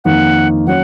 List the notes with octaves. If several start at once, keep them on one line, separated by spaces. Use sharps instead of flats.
F2 D#3 A#3 D#4 F#5
D#3 F#3 C#4 F#5